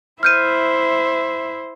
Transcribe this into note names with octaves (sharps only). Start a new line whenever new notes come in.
E4 C5 E5 F6 G6 D#7